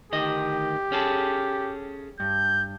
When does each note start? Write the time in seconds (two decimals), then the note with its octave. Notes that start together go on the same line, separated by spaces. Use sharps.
0.12 D2 D#3 G4 D#5
0.92 C#4 G#4 A4
2.20 G2 G6